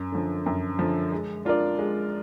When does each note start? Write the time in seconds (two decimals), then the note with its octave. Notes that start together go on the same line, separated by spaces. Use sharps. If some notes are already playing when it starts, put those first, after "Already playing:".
Already playing: F#2
0.12 D3 F3
0.46 F#2
0.79 D3 F3
1.12 G#3
1.45 D4 F4 A#4 D5
1.79 G#3